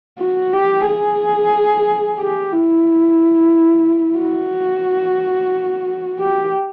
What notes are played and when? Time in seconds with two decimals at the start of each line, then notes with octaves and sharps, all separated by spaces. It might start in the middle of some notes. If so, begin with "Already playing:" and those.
0.19 F#4
0.53 G4
0.86 G#4
2.19 G4
2.52 E4
4.19 F#4
6.20 G4